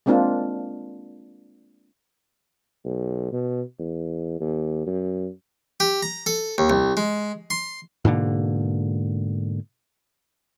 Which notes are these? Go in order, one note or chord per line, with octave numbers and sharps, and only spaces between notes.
G#3 A#3 C4 D4 F4
B1
B2
E2
D#2
F#2
G4
A#5
A4
D#2
C2
G#3
C6
G#2 B2 D3 A#3